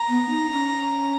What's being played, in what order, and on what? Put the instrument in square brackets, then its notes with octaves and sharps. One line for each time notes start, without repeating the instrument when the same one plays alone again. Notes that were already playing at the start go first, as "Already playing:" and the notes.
Already playing: [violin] A#5
[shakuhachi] B3
D#4
C#4